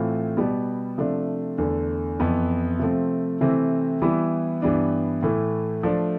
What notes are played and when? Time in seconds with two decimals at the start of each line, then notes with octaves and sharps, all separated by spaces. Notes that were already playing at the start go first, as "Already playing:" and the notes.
Already playing: A2 E3 A3 C4 F4
0.37 B2 G3 B3
0.98 C3 F3 A3 D4
1.58 E2 D3 A3
2.20 F2 E3 B3
2.79 C3 F3 A3 C4
3.41 C3 E3 A3 C4
4.02 E3 G3 B3 E4
4.62 G2 E3 G3 B3 D4
5.23 A2 E3 A3
5.83 F3 A3 D4